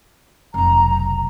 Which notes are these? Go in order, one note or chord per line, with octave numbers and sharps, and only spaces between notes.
F1 B1 A#5